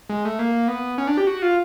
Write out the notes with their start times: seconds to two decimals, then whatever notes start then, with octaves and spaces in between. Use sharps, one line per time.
0.09 G#3
0.25 A3
0.39 A#3
0.68 B3
0.98 C#4
1.07 D4
1.17 G4
1.27 F#4
1.42 F4